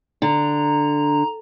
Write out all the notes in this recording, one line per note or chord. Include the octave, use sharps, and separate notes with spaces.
D3 A#5